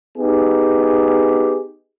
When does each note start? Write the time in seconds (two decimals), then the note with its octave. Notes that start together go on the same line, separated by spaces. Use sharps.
0.16 B3 D#4 G4 G#4